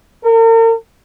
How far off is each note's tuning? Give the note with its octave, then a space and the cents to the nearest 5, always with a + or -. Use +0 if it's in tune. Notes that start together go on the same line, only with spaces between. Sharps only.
A#4 -40